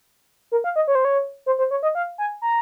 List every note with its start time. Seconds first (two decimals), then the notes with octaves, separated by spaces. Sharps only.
0.52 A#4
0.64 F5
0.76 D#5
0.88 C#5
0.95 C5
1.05 C#5
1.46 C5
1.58 C5
1.71 C#5
1.83 D#5
1.95 F5
2.18 G#5
2.42 A#5